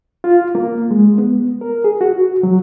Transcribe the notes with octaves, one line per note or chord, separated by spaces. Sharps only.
F4
A#3
G#3
B3
A#4
G#4
F#4
F#3